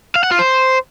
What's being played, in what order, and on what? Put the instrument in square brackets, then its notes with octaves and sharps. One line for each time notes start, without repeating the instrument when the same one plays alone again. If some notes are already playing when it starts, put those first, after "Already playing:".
[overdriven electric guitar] F5
F#5
F4
C5